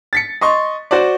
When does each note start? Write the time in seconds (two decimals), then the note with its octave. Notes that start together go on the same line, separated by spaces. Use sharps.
0.13 A6 B6 C#7
0.41 D#5 C6 C#6
0.91 F#4 C5 D5